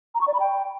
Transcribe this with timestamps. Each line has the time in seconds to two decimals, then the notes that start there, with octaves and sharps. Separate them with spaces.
0.15 A#5
0.21 C#6
0.27 D5
0.34 B5
0.40 G5